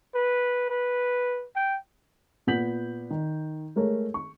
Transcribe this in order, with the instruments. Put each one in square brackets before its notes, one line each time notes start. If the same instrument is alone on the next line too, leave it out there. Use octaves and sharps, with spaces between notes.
[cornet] B4
B4
G5
[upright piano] A#2 B3 F#5 G6 B6 F#7
D#3
G#3 A3 A#4 C#5
C#6